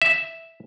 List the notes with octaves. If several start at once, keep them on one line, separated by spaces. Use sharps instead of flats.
E5